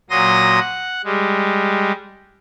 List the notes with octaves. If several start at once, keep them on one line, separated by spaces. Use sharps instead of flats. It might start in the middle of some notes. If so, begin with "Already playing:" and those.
A#2 F#3 C6 D#6 A#6
F#5
G3 G#3